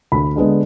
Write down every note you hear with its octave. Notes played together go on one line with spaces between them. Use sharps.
D2 B5
D3 G#3 B3